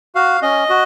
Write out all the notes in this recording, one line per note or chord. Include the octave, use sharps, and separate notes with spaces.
F#4 F5
C#4 D#5
F#4